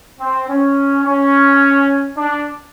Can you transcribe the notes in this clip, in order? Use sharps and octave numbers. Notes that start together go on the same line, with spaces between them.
C4
C#4
C#4
D4